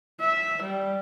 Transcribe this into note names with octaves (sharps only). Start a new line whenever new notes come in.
E5
G3